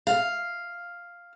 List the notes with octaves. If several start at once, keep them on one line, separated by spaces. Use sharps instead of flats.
F5